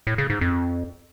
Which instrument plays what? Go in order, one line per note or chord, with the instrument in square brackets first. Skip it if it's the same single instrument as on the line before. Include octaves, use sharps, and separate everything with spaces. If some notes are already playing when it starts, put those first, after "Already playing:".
[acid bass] A2
C#3
G#2
F2